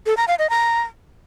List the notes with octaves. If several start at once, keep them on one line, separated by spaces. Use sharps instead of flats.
A4
A#5
F5
D#5
A#5